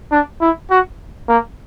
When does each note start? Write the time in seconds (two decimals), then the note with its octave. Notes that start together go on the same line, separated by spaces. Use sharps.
0.12 D4
0.41 E4
0.71 F#4
1.29 A#3